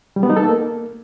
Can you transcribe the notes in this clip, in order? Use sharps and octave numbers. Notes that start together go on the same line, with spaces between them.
G3
B3
D#4
A4
A#3